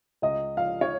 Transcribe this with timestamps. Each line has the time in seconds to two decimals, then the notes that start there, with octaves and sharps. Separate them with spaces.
0.22 C#2 D#5
0.57 F3 F5
0.81 C#5